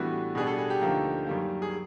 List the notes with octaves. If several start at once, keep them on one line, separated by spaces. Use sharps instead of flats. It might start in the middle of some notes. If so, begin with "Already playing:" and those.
Already playing: A2 E3 G3 B3 D4 F#4
B2 G3 B3 D4 G#4
A4
G#4
G4
D2 D3 F3 A#3 D#4
F#2 D#3 G3 A#3
G#4